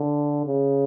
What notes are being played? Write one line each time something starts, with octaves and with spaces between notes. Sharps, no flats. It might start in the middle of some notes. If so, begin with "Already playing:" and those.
Already playing: D3
C#3